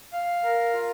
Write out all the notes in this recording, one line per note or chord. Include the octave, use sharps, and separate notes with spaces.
F5
A#4
F4